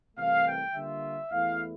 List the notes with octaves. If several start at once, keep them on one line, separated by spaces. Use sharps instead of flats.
C2 C3 E3 A3 F5
G5
D3 G3 A#3 F4 E5
E2 E3 A3 E4 F5